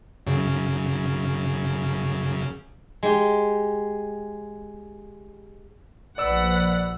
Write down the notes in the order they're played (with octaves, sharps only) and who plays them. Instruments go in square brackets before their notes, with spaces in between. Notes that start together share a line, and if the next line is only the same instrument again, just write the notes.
[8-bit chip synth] F#2 C#3
[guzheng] G#3 G4
[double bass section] A#1 [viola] B4 F#5 [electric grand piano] D5 E6